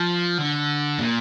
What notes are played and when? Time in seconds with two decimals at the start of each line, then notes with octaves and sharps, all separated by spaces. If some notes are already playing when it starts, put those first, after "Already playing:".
Already playing: F3
0.38 D3
0.99 A#2